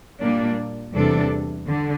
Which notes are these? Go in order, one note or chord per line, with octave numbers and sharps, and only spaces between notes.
A#2 G3 A#3 D4
E2 C3 G3 D4 A4
D3